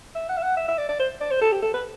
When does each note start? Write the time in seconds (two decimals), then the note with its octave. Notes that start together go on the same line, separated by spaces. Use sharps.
0.15 E5
0.29 F#5
0.37 E5
0.42 F#5
0.57 E5
0.68 E5
0.78 D5
0.89 D5
0.99 C5
1.21 D5
1.31 C5
1.41 A4
1.52 G4
1.62 A4
1.74 B4